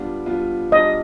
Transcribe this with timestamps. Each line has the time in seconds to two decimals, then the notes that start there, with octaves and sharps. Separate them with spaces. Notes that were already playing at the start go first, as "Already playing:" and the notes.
Already playing: G3 B3 D4 F4
0.26 G3 B3 D4 F4
0.71 G3 B3 D4 F4 D#5